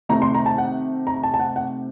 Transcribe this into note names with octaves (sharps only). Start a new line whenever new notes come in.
C3 D#3 A3 D#4 A#5
C6
A#5
A5
F#5
A#5
A5
A5
F#5
F#5